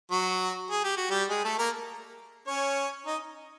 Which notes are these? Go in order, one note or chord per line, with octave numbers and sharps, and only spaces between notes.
F#3 F#4
G#4
G4
F#4
G3 G4
G#3 G#4
A3 A4
A#3 A#4
C#4 C#5
D#4 D#5